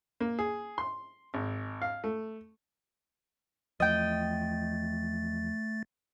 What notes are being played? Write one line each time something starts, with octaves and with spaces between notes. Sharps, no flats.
A#3
G#4
C6
G#1
F5
A3
E2 F3 A3 D#5 G5 A6